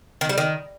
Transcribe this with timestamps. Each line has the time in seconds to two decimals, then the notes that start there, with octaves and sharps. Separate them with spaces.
0.21 D#3
0.29 G3
0.38 D#3